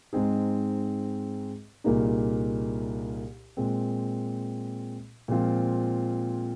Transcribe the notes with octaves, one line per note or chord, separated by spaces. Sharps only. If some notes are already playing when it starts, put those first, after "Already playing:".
G#2 G#3 C4 D#4 G#4
C2 A#2 A#3 D#4 G#4
A#2 G#3 C4
A#2 F3 G#3 C4 F4